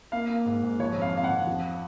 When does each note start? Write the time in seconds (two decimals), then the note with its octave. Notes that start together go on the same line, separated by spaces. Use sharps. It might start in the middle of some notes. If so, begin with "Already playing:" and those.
0.12 A#3 F5
0.30 A#3
0.46 G#2
0.63 G#2
0.79 F3 C#5
0.97 F2 F5
1.13 F2 F5
1.24 F#5
1.31 F2
1.47 F3